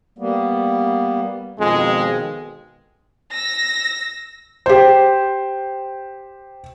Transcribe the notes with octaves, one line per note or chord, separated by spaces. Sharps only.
G3 A#3 B3
F2 B2 D#3 G#3
E6 A#6
G4 C5